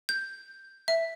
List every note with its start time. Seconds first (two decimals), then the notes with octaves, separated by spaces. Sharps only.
0.09 G6
0.88 E5